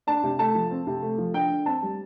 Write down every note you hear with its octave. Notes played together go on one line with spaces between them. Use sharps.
D4 A5
C3
A3 A5
F3
C4
C3
A3
F3
D3 G5
D3
C4 A5
G3